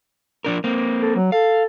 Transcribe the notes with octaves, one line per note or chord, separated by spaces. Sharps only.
F3 D4 A#4
A#3 C4
A4
F#3
A4 F5